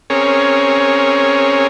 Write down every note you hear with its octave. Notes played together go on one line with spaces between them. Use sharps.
C4 C#4 G#4 A#4 C#5